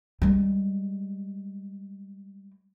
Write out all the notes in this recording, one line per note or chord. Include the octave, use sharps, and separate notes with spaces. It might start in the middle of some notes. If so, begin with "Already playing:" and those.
G3 G#3